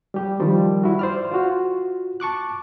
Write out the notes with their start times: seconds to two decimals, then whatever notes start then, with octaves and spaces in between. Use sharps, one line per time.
0.14 G3 G4
0.40 D#3 F3 G3
0.83 E4 F#4
0.99 C5 D5 F6
1.32 F4 F#4
2.20 A5 C#6 D6 F#6